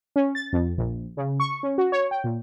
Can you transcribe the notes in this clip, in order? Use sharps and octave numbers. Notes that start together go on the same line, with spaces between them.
C#4
A6
F2
A#1
C#3
C#6
C#4
F#4
C#5
G5
A#2